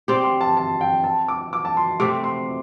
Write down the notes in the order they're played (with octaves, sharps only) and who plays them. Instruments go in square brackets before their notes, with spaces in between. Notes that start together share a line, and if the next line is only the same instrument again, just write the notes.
[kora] C4 G4 D5 [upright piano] C6
[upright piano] C6
A5
A5
G5
A5
D6
D6
A5
C6
[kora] C3 A3 C4 [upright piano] D6
[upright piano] C6